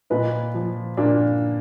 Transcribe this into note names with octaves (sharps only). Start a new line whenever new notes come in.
A#2 B4 D#5
F3
A#2 A#3 D4